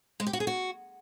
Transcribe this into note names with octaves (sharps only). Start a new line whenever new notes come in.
G#3
G4
F#4
G#4
F#4